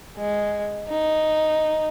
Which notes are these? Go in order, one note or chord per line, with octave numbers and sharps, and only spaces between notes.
G#3
D#4